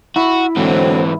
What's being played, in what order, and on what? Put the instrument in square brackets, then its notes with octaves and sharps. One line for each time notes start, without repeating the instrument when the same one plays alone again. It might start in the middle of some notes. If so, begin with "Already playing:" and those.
[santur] E4 [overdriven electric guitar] F#4
[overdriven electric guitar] G#2 E3 [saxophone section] D3 F#3 C4